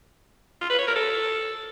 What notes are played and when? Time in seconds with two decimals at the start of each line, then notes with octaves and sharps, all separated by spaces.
0.61 F4
0.70 B4
0.78 C#5
0.87 A#4
0.96 A4